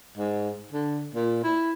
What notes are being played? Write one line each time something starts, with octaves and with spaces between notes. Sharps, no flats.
G#2
D3
A#2
E4